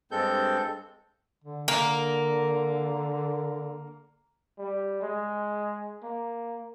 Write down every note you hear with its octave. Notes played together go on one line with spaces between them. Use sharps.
G2 G#3 C4 A4 G6
D3
D3 A#3
G3
G#3
A#3